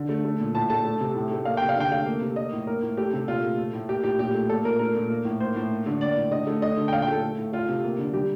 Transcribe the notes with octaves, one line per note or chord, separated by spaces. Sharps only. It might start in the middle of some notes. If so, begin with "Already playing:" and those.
Already playing: D3
A3
A3
A#2
A2 A5
A3 A5
A3
C3
A2
A3
A#3 F5
C3 G5
F5
D3 G5
A3 F5
A#3
C3
A#3 D#5
A2
A#3 A#4
A2
A3 G4
C3
A#2 F4
A3
A3
A2
A#3 G4
A2 G4
A#2 G4
A3
A#3 A4
A#2 A#4
A3 A#4
A#2
A#3
A2
A#3 C5
A2
A#3
D3
A#3 D5
A2
D3 D#5
A3
A3 D#5
D3
G5
A#2 F5
G5
A3 A4
A3
A2
A3 F4
C3
A#3
D3
G3 G4